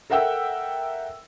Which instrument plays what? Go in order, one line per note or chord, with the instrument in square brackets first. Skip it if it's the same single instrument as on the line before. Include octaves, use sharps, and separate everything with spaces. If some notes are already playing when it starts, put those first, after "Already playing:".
[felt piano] A4 A#4 E5 F#5 G5 E6